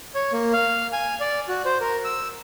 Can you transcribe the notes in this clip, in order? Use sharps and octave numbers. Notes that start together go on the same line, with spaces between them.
C#5
A#3
F5
G#5
D5
F#4
C5
A#4
E6